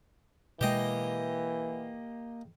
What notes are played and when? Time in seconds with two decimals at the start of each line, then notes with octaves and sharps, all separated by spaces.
0.61 B2 E3 G#3 A#3 G4 D#5 G5